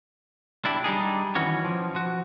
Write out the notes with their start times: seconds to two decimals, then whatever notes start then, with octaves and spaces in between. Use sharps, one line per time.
0.65 D4 E4 G4
0.84 G3 D4 D#4 G#4
1.35 D#3 E3 C#4 F#4 C#5
1.65 F3
1.94 F3 F#4